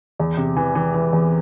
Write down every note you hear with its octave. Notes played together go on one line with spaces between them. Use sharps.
E2
C3
E3
E3
E3
E2